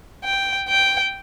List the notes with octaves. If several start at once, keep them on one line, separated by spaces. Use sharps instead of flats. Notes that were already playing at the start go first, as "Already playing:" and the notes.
G5
G5